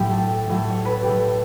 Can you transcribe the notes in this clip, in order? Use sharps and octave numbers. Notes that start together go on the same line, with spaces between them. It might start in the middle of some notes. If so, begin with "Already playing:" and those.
Already playing: A2 F#3 G4
A4
A4
A2 F#3 A4
C#5
A4 B4
G4
A2 F#3 A4